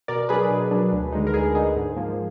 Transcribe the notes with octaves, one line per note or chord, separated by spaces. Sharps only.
B2 A#4 D5
F#3 D4 G#4 B4
B2
F#3 D4
D2
D3 G#3 D#4
A#4
D2 G#4
D3 G#3 D#4 G#4
G#2
F3 A#3